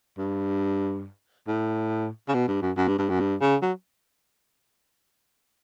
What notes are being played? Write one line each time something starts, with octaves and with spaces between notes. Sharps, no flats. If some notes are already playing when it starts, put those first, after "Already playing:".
G2
A2
C#3
B2
G2
F#2
F#2
G2
G2
F#2
G2
C#3
F#3